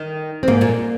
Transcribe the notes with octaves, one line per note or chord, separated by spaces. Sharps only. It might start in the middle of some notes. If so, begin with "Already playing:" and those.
Already playing: D#3
C4
G#2 A#3
A#2